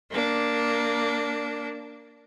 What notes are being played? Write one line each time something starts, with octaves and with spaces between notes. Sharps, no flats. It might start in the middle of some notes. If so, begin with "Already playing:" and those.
A#3 D4